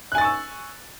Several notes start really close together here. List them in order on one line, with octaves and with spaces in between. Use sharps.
F#6 G#5 A6 C#6 E6